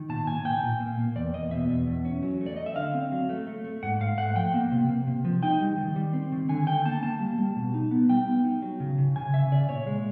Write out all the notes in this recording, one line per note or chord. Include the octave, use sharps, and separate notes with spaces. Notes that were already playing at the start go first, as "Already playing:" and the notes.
Already playing: D#3
A#2 A5
A#2 G#5
A#2 G5
A#2
A#3
A#3
E2 D5
E2 D#5
B2 E5
E2
E2
C#4
F#3
A3
D5
A3 D#5
E5
D3 F5
C4
F#3
A3
A3
A3
G#2 F#5
G#2 F5
A3 F#5
F3 G5
A#3
C3
A#3
C3
F3
D#4 G5
G3
D#3
G3
C4
D#3
D3 G#5
D3 G5
A#3 A5
A#3 A5
G3
G3
B2
D#4
B3
G3 G5
B3
D#4
F#3
C#3
C#3
C#3 G#5
C#3 E5
C#3 D5
A#2 C#5
G#3